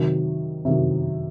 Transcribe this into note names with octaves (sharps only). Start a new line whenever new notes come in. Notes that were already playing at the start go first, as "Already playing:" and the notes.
Already playing: C3 D#3 F#3
C3 D#3 F#3